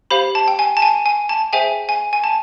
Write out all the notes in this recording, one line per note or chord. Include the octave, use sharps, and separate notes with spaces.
G4 C5 F5 B5
A5
G5
G#5
A5
G#5
G#5
A5
G#4 C5 E5 G5 G#5
G#5
G#5
A5